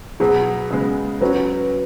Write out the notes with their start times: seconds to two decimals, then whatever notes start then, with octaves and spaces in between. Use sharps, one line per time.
0.20 B2 F#3 B3 G#4
0.71 C#3 G#3 B3
1.21 F#3 C#4 F#4 B4